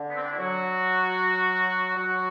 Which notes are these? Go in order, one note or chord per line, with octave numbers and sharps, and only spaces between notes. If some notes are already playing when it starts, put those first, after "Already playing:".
Already playing: D3
B3
C4
D4
E4
F#3 F#4
F#3 F#4